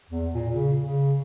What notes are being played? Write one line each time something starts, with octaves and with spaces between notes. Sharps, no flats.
E2
A#2
C#3
C#3